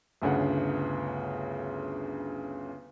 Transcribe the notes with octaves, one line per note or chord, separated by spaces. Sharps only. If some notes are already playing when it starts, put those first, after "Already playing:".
G1 D2 C#3 F#5